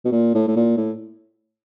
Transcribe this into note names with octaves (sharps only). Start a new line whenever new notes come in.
B2
A#2
A2
A2
A#2
A2